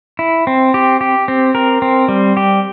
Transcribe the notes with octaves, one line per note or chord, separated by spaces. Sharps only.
E4
C4
G4
G4
C4
A#4
C4
G3
G4